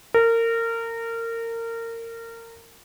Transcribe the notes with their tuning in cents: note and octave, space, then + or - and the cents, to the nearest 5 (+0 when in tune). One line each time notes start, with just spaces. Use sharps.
A#4 -25